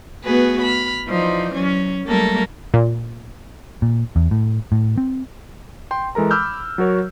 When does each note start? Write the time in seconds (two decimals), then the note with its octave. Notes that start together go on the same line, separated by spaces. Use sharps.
0.24 A3 B3 F#4 G#4 B4
0.63 B5 F6
1.09 E3 F3 D#4 C5 D5
1.55 F#3 C#4
2.05 F#3 G3 A3 A#3 A4 A#4
2.74 A#2
3.82 A#2
4.16 E2
4.31 A2
4.72 A2
4.97 C4
5.91 G5 C6
6.15 E3 G#3 A4 A#4 A#5
6.31 B5 D6 E6 F6 G6
6.78 F#3 F#4 A#4 C#5